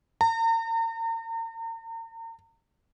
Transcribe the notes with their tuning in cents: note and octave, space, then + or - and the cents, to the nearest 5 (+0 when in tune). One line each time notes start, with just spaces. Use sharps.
A#5 -40